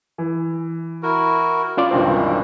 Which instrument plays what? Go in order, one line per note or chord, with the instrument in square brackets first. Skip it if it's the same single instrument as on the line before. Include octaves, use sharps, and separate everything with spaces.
[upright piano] E3
[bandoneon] E4 F#4 A#4
[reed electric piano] C#4 F4 D5
[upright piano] C#2 G2 C4 [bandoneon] B2 D#3 E3